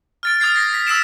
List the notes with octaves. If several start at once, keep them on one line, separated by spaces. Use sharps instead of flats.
F6 A6 D7
D#6 F6 G#6 A6 C7
A#6 C7
A#6 B6
D#6 E6 B6 C7 D7 E7